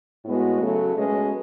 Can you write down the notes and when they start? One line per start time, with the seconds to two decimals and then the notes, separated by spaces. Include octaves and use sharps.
0.24 A2 G#3 B3 F#4
0.61 C#3 F#3 A3
0.96 B2 G#3 C#4 G#4 B4